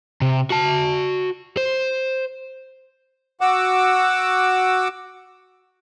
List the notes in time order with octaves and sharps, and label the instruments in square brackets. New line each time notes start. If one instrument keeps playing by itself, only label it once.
[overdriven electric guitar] C3
F#4 A5
C5
[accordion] F#4 F#5 D6 E6